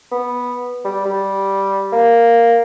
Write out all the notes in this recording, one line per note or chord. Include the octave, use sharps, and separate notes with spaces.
B3
G3
G3
A#3